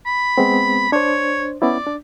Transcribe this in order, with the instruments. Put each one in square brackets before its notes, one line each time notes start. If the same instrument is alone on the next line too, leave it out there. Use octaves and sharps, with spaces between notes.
[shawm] B5
[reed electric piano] G#3 B3 C4
[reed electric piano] D4 C5 [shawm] C#5
[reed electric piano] B3 C#4 E4 [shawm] D5
[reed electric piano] D4